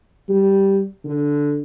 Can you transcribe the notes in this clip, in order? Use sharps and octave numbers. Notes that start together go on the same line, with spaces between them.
G3
D3